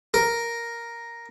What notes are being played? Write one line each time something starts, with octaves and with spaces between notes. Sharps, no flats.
A#4